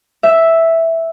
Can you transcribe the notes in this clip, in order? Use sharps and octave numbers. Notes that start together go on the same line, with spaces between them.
E5